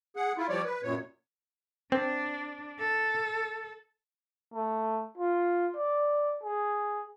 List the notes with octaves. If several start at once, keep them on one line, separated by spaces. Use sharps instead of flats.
G#4 F#5
E4 F4
F3 G3 C#5 D5
B4
F#2 A#2 C#5
C4 D4
A4
A3
F4
D5
G#4